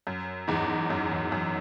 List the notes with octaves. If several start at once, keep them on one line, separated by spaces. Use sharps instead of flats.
F#2
E2 G#2
F#2
E2
F#2